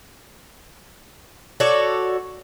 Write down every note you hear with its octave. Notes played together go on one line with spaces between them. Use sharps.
F#4 A4 C#5 D5